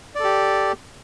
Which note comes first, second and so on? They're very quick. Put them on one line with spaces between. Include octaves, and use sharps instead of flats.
D5 A4 G4